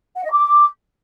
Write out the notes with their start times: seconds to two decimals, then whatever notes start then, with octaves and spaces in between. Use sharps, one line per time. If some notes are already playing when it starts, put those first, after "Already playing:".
0.15 F#5
0.24 D#5
0.32 D6